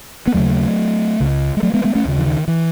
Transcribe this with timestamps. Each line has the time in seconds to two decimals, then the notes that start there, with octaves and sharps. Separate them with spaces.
0.27 B3
0.34 D#2 C#3 F#3 A3
1.20 C#2 C#3
1.57 G#3
1.63 F#3 A3
1.73 G#3 B3
1.84 G#3 B3
1.95 A3 C#4
2.05 D#2 C#3
2.18 E3
2.26 D#3
2.48 E3